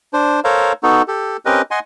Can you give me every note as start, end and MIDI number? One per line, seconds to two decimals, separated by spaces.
0.13 0.40 62
0.13 0.40 72
0.44 0.73 69
0.44 0.73 70
0.44 0.73 72
0.44 0.73 73
0.44 0.73 77
0.44 0.73 82
0.83 1.02 59
0.83 1.02 63
0.83 1.02 66
0.83 1.02 69
1.08 1.37 67
1.08 1.37 69
1.46 1.62 60
1.46 1.62 61
1.46 1.62 67
1.46 1.62 70
1.46 1.62 71
1.46 1.62 75
1.71 1.79 75
1.71 1.79 78
1.71 1.79 80
1.71 1.79 84